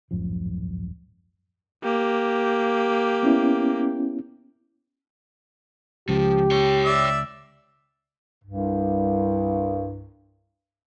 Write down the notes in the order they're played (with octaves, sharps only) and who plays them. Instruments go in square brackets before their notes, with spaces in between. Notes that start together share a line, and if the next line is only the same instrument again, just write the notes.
[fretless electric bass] D1 G#1 F#2 F3
[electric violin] A#3 G4
[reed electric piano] B3 C#4 E4
[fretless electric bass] C#2 [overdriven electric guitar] F3 [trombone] G4
[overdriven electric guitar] C#5 G5
[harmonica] D5 E5 E6
[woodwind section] C2 G2